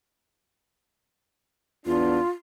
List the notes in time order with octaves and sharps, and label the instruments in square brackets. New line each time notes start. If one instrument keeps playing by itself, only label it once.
[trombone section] E2 B3 D4 [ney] F4